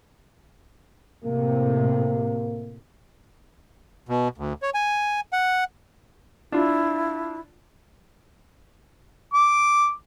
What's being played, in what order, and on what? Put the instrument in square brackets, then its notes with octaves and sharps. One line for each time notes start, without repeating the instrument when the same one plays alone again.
[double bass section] A2 C3 [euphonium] A#3
[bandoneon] B2
D2
C#5
G#5
F#5
[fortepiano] D4 F4 [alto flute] E4
[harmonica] D6